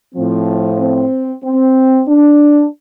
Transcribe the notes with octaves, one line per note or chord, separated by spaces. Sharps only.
A2 F3 C4
C4
C4
D4